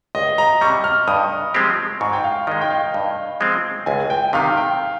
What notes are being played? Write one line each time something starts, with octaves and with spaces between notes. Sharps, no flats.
C#2 D#5
A#5
C3 G3 C#6
F6
G2 D#6
F3 G#3 C4 G4
G#2 C#6
G5
F5
D#3 G#3 D#5
G5
F5
G2
F3 G#3 C4
C#2 G#5
G5
C3 D#3 F5
G5